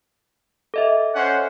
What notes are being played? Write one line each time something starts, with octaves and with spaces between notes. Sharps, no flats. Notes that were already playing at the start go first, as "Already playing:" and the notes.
A4 D#5 E5
C#4 C5 F#5